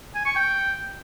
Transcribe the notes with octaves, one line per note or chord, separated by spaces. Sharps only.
G#5
C#6
G5